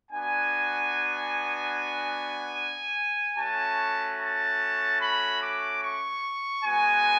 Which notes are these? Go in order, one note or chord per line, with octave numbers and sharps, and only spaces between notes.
B3 D4 F#4 G#5
A3 C#4 F#4 A5
A5
B5
D6
C#6
G#3 B3 F#4 G#5